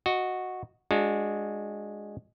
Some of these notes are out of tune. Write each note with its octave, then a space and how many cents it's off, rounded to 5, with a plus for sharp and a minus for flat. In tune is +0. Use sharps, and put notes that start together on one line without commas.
F#4 -5 D#5 +0
G#3 +0 D4 +0 F#4 -30